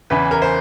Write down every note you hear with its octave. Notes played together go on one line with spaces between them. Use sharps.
E2 C#3 E3 B4
A#4
C5